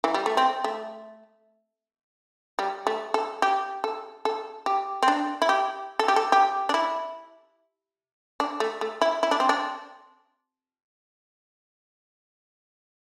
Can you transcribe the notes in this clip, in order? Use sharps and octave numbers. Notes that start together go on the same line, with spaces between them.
E3
G3
A3
C4
A3
G3
A3
A4
G4
A4
A4
G4
C4
D4
E4
G4
A4
G4
A4
G4
D4
E4
D4
A3
A3
E4
E4
D4
C4
D4